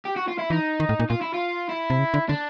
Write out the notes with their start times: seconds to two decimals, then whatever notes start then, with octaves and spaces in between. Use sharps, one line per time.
0.05 G4
0.16 F#4
0.28 F4
0.39 E4
0.50 E3 D#4
0.80 D#3
0.89 A2
1.00 A#2
1.10 A#2 F4
1.21 E4
1.34 F4
1.69 E4
1.90 C3
1.99 C#3
2.14 D3
2.29 D3 D4